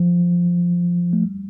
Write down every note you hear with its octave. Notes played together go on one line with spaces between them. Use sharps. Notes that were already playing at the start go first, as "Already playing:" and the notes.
Already playing: F3
A3
G3